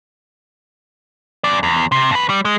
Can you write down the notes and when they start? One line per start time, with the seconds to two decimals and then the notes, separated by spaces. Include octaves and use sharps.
1.44 F#2 D5
1.63 E2
1.92 C3
2.11 F2 B4
2.30 G3
2.45 G#3